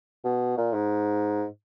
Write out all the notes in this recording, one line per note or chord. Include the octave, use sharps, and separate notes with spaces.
B2
A#2
G#2